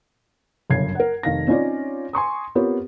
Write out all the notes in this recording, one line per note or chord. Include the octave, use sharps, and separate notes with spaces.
G1 F#2 C#3 G#6 C7
A#4 F#5
F1 D#3 F5 A#6
C4 C#4 D#4 F4 C#5 D5
G#5 C6 C#6 D#6
B3 C4 F4 G4 A#4 C#5